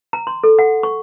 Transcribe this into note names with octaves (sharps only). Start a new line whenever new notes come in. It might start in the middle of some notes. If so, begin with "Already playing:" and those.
A#5
C6
A4
F#5
C#6